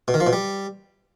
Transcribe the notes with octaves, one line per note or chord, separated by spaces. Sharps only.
B2
D#3
F3
B2
G3